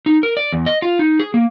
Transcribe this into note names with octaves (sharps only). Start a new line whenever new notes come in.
D#4
A#4
D5
E2
D#5
F4
D#4
G#4
A#3